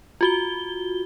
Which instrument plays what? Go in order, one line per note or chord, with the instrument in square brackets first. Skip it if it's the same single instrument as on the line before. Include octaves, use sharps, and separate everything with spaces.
[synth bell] F4 F#4 G7